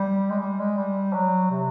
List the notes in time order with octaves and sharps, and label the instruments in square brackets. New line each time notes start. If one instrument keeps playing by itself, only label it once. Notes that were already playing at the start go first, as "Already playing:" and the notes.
Already playing: [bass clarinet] G3
G#3
G3
G#3
G3
F#3
C3